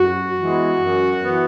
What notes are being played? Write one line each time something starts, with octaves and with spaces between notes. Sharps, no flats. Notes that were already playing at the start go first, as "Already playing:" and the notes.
Already playing: F#2 F#4
E3 G#3 B3
F#2
E3 B3